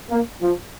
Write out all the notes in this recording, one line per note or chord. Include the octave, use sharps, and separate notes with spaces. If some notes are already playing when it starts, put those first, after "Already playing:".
A#3
F3